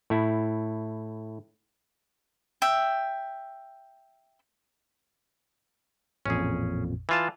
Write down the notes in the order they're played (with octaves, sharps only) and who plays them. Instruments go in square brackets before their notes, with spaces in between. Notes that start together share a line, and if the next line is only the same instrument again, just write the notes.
[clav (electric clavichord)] A2 E4
[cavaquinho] E5 G5
[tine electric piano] A1 F2 A#2 [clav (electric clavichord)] C#4 G#4
[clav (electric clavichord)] E3 F4 A5